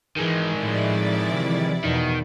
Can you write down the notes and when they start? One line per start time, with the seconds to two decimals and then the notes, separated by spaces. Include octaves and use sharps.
0.17 D#3 E3 G#3
0.56 A2 F3 E4 D5
1.30 C3 E3
1.84 E2 B2 D#3